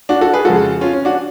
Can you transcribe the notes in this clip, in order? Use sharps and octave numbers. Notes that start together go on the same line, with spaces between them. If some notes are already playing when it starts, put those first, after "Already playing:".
D4 F#4
F#4 A4
G#4 B4
F2 C#3 G#3 F#4 A4
C#4 F4
C#4
D4 F#4